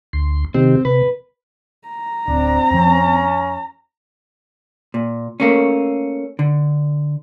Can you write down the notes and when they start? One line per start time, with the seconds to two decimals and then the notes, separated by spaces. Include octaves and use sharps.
0.13 D2 C6
0.54 C3 D#3 C4 G4
0.85 C3 B4
1.88 A#5
2.28 D1 C4 D4
2.71 F2 F3 C#4
4.94 A#2
5.40 A3 A#3 C#4
6.39 D3